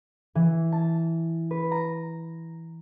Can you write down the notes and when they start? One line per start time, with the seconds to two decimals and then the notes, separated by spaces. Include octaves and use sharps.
0.35 E3
0.72 A5
1.51 B4
1.71 A#5